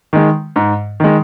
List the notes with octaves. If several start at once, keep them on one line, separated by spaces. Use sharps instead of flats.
D#3 G#3
G#2
D#3 G#3